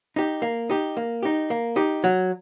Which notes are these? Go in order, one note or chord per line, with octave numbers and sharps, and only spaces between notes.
D#4 G4
A#3
D#4 G4
A#3
D#4 G4
A#3
D#4 G4
F#3